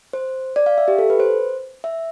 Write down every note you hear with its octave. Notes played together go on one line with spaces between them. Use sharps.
C5
D5
F5
E5
G4
A4
B4
C5
E5